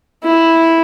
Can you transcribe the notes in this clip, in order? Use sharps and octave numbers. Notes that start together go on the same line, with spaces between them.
E4